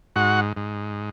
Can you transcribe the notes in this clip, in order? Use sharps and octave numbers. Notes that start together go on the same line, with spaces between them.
G#2 F#4 F#5
G#2